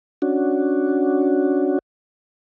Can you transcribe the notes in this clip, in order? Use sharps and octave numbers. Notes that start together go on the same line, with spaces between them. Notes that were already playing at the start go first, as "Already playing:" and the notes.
C#4 D4 F#4